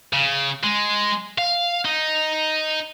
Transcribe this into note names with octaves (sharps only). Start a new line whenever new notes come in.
C#3
G#3
F5
D#4